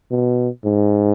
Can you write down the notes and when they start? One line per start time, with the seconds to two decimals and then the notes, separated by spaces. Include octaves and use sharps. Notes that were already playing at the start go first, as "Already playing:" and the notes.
0.11 B2
0.65 G#2